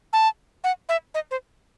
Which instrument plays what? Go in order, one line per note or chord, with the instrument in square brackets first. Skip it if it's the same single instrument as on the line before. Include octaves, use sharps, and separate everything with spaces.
[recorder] A5
F#5
E5
D#5
C5